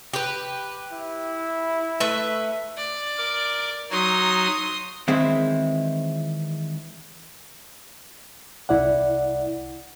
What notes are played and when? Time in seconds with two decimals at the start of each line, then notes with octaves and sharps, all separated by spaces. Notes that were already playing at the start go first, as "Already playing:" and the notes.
0.13 G4 B4
0.92 E4
2.00 A3 B4 E5
2.77 D5
3.18 A#4 D6
3.91 F#3 D#4 F#4 C6 D#6
5.08 D#3 E3 G#3 C4 E4
8.69 C2 E4 D5 F#5